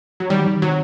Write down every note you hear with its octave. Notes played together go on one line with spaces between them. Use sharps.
F#3
D#3 G3
D#3
C3 F#3